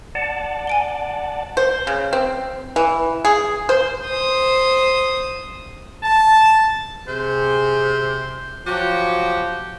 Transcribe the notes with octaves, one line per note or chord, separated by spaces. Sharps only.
D5 F#5 A5
G#5 D7 G7
C5
C#3
C4
E3
G#4
C5
C5 D#6
A5
C3 G#4 C5
F3 F#3 F#4 G4